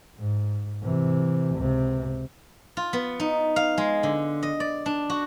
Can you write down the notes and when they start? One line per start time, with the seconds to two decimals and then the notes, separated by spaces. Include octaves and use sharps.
0.18 G#2
0.83 C3 E3
1.56 C#2 C3
2.77 F4
2.93 B3
3.20 D#4
3.56 F5
3.78 G#3
4.03 D3
4.43 D#5
4.60 D5
4.86 D4
5.10 F#4